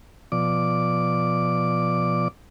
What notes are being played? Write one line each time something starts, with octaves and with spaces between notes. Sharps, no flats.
B2 F3 D5 D6